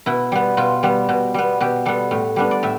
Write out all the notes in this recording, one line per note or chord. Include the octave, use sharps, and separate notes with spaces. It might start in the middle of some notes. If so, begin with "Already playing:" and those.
B2 E4
G3 B3
B2 F4
G3 B3
B2
G3 B3
B2 G4
G3 B3 A4
A2
G3 B3 D4
D5
A2 E5